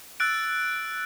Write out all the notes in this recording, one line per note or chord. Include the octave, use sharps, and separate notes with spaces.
E6 F#6 A6 D7